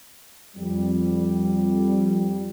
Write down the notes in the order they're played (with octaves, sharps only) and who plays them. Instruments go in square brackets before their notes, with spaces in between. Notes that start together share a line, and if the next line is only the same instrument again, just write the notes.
[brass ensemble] F2 G3